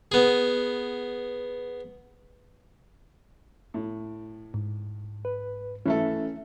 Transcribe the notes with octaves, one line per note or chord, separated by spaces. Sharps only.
B3 G#4
A2
G#2
B4
E3 A3 C#4 A4 E5